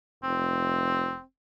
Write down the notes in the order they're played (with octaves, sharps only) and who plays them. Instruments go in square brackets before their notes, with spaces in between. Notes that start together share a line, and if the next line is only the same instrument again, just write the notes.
[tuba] F1 [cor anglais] C4